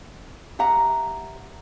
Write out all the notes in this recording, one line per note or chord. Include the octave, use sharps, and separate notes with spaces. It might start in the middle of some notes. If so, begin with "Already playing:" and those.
G4 E5 F#5 A#5